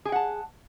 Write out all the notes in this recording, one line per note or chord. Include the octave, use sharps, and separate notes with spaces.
G#4 F#5 G5 A5